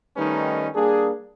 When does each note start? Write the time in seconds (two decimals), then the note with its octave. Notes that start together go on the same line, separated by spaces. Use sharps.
0.17 D#3 G3 A3 C#4 D#4 B4
0.75 G3 A#3 D4 G#4